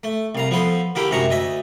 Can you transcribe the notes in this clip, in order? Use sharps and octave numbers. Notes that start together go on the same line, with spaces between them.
A3
C2 F5 A#5
F3 B3 A4 C6
D3 A#3 E4 G4
F#2 C3 G#3 A#5 C#6
D2 D#5 E5